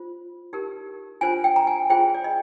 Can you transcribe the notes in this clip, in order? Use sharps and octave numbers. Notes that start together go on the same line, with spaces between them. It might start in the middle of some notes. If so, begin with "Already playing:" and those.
Already playing: F4 C5
D#4 G4 A#4
D4 F4 C5 G#5
G5
A#5
G#5
F4 G#4 C5 G5
D5
D#5